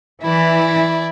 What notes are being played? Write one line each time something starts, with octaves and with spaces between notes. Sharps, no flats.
E3 E4 D5